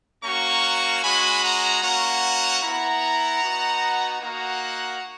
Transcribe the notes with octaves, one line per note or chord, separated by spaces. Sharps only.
A#3 C#4 F#4 A#5 C#6
G#3 C#4 F#4 G#5 B5
F#5 A#5
A#3 C#4 F#4 F#5 A#5
B3 E4 F#5 A#5
B3 D#4 F#4
A#3 D#4 F#4 F#5 A#5